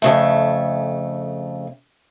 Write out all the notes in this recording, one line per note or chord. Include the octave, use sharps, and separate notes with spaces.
F2 C#3 A3